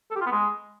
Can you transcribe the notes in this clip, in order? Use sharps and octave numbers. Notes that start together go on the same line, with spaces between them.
A4
G4
F4
B3
G#3